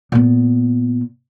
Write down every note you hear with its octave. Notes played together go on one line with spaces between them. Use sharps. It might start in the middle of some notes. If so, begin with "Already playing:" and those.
A#2 B3